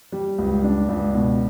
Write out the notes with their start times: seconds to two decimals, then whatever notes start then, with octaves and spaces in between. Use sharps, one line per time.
0.12 G3
0.38 C#2
0.64 D4
0.89 C#2
1.13 B2